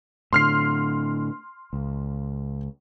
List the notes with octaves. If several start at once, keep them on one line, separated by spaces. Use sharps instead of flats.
A2 D3 C6 F6 C7
C#2